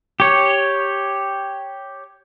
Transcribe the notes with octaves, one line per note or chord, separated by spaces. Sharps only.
G4 C#5